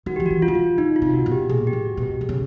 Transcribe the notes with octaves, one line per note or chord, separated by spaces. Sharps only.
D#3 F#4
F3 G4
F#4
E3
F4
D#3
E3
D3 D#4
F4
C3
F#4
B2
G4
A#2 G#4
G4
A2
F#4
B2
G4
C3 G#4
C#3